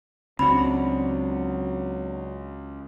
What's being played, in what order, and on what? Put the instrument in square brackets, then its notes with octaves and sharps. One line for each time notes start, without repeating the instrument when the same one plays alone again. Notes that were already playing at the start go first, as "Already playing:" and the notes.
[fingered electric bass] C#2 [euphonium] F#3 [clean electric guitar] C4 D4 F#4 [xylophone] B5